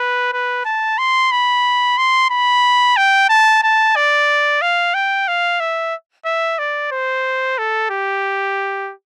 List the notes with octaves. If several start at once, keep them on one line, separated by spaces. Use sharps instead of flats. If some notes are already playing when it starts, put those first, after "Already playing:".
Already playing: B4
B4
A5
C6
B5
C6
B5
G5
A5
A5
D5
F5
G5
F5
E5
E5
D5
C5
A4
G4